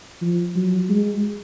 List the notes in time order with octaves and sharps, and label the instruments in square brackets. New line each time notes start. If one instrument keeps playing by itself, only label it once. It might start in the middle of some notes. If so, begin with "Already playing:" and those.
[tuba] F3
F#3
G#3